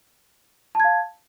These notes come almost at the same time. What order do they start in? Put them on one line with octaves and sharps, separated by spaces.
A5 G#6 F5